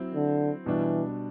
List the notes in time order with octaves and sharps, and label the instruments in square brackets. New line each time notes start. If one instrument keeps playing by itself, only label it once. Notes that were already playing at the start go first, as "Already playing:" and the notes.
Already playing: [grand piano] F#3 C4 E4
[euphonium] D3
[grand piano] B2 G3 D4 [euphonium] E3